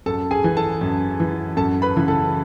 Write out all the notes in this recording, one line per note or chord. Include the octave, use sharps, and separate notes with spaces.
F#2 A4 A5
G#4 G#5
E3
A4 A5
F#2
E3
F#2 A4 A5
B4 B5
C#3 E3
A4 A5